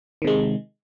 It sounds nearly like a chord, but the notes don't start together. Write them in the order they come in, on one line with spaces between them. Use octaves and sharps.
D#3 C3 G#3